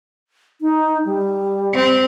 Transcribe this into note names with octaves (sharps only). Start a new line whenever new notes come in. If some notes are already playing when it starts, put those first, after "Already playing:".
D#4
G3
C4